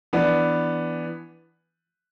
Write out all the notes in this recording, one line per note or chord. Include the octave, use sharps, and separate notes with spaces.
E3 B3 D4